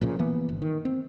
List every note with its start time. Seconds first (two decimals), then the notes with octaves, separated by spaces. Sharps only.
0.01 A#1 A#2 C#3
0.19 E3 A#3 B3
0.49 G1
0.62 D#3
0.85 C4